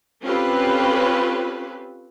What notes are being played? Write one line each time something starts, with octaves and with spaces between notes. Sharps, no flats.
C4 C#4 F4 G4 A4 B4